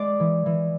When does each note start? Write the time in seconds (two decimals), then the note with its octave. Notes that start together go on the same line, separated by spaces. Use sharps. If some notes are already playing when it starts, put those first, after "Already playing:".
Already playing: G#3 D5
0.20 E3
0.46 E3